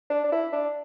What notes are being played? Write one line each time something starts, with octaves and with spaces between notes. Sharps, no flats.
D4
D4
E4
D4